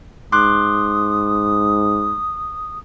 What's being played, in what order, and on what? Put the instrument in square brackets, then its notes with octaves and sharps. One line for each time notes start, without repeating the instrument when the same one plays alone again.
[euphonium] G#2 [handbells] C6 D6 F#6 [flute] D#6